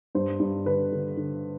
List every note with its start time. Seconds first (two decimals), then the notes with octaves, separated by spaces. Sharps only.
0.15 G2 C5
0.40 G2
0.65 D3 B4
0.92 D3
1.17 D3